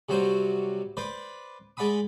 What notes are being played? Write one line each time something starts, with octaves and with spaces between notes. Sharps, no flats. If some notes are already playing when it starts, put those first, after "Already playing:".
C3 F#3 G3 F#4 C5
B4 C5 D5
G#3 D5 F#5 B5 D#6